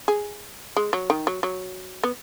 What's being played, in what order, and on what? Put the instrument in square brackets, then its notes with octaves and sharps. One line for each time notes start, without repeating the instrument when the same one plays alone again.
[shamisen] G#4
G#3
F#3
D#3
F#3
F#3
B3